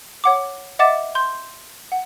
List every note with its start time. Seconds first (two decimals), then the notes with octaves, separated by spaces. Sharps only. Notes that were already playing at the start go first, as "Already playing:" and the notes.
0.24 C#5 F#5 D6
0.79 D#5 E5 F#5 D6 A6 E7
1.15 C6 G6
1.92 F#5